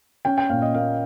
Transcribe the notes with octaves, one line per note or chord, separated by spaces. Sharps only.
C#4 G5
G5
A#2 F5
D#5
A#3 F5